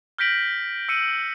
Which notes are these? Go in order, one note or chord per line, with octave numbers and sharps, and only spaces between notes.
F6 G6 A#6 B6 D7 F#7
E6 C#7 D#7